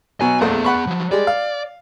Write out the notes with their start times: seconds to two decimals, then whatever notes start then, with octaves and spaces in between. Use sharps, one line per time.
0.21 B2 F#3 G#5
0.41 A#1 E2 A3 B3 G#4
0.65 F#5 B5 C#6
0.87 F3 F#3
1.11 G3 G#3 D5
1.27 F5